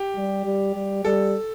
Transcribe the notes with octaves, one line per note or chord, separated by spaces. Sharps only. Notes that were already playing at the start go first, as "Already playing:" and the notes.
Already playing: G4
G3
G3
G3
G3 A4